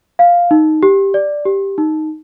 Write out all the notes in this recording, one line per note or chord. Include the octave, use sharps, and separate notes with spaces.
F5
D#4
G4
D5
G4
D#4